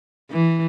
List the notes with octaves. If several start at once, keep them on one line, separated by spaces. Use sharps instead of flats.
E3